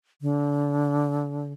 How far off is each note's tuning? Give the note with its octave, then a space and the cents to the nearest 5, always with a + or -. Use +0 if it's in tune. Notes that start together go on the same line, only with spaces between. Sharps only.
D3 -25